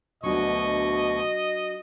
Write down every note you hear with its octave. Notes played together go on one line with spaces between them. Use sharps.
D2 B2 F#3 D4 F#4 D#5 C#6